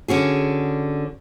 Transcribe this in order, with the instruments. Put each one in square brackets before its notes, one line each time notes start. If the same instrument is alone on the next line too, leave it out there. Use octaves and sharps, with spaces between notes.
[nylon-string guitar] D3 C#4 F#4 G#4